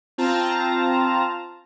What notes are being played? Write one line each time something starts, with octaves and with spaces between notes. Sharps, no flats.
C4 F4 A5 A#5